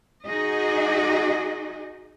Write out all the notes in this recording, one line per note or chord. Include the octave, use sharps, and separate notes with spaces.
D#4 F#4 G#4 D#5